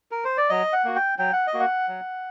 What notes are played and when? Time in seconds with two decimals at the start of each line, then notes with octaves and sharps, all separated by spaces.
0.11 A#4
0.25 C5
0.37 D5
0.49 F#3 D#5
0.73 F#5
0.84 A#3 F#4
0.96 G5
1.19 F#3 G5
1.33 F#5
1.47 D#5
1.54 A#3 F#4
1.60 F#5
1.88 F#3